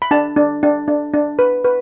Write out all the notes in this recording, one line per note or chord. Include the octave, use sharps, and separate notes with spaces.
B5
D4 A5
D4
D4
D4
D4
B4
B4